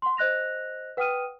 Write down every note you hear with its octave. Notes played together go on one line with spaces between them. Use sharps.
F#5 C6
C5 D#5 F#6 A#6 F7
B4 F#5 G5 D#6 F6 D#7